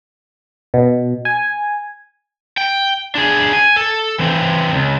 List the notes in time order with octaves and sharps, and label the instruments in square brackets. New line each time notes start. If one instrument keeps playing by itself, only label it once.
[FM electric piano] B2
G#5
[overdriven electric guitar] G5
D4 G#4
G#5
A4
E3 C4
C#2